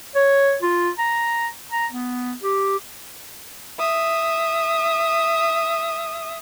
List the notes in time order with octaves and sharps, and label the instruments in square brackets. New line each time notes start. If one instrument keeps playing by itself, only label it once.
[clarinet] C#5
F4
A#5
A#5
B3
G4
[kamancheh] E5 D#6